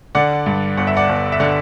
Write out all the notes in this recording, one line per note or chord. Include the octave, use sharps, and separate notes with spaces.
D3 D5 F#5
G2
G1 F#5
E5
D5 F#5
G1
E5
D3 D5 F#5